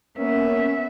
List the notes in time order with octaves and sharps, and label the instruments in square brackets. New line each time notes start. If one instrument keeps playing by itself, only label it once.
[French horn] A#3 [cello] B3 E5 [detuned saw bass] C#4